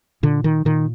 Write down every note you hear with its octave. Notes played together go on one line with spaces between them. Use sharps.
A#2 D3
D#3
A#2 D#3